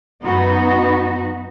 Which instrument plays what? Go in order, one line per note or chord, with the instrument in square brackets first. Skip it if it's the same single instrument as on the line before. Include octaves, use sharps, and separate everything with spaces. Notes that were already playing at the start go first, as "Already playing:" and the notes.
[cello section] F#2 B3 D#4 F#4